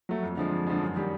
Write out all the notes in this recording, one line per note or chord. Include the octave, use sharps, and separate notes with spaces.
F#3 A3
F2
D3 F3 G#3
F2
D3 F3 G#3
F#2
D#3 G3